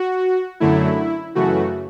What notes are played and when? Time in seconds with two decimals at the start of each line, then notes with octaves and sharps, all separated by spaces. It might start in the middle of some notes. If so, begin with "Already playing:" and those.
Already playing: F#4
0.60 F#2 D3 F#3 A3 E4
1.35 F#2 C#3 E3 A3 F#4